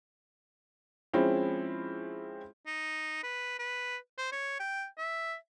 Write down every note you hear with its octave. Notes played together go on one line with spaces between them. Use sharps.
F3 G#3 C4 C#4 E4
D#4
B4
B4
C5
C#5
G5
E5